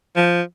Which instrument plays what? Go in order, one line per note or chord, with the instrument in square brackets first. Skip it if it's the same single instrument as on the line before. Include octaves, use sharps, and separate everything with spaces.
[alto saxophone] F3